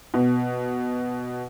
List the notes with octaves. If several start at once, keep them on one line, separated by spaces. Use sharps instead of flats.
B2